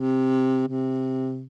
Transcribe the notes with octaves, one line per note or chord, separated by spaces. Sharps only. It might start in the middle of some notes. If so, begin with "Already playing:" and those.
Already playing: C3
C3